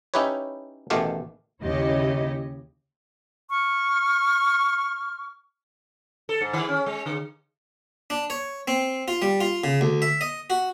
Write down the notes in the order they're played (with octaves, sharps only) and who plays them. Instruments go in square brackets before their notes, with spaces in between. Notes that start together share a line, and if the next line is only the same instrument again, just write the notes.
[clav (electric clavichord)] C#4 D#4 E4 G4 B4 C#5
A1 B2 D#3 A3 G4 F5
[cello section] D#2 C#3 E4 G4 C#5 D#5
[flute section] C#6 F6
[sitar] A4
G#2
D#3
C#4
G#3
D3
[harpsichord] D4
C#5
C4
F4
G3
F4
C#3
D2
E5
D#5
F#4